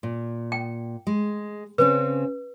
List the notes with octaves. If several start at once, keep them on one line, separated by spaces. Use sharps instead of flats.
A#2
G5
G#3
C#3 C4 C#4 B4